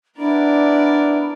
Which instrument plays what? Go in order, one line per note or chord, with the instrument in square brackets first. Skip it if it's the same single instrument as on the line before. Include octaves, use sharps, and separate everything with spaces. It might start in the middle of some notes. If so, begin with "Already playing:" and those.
[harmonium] B3 E4 [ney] D4 [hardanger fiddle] A#4 D5